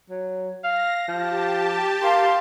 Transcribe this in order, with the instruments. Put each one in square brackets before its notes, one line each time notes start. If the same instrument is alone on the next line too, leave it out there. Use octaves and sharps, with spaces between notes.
[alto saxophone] F#3
[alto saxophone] F5 [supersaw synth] A#6
[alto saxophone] F3 [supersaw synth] G4 A5
[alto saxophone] A#4 [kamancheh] F5 C6